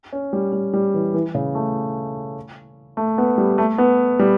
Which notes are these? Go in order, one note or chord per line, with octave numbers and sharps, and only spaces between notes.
C#4
G3
G3
G3
E3
E3
C#3
A3
A3
B3
G3
A3
B3
G3